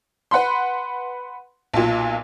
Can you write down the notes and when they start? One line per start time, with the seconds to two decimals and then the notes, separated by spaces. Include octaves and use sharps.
0.31 B4 F#5 B5 C6
1.74 B1 A#2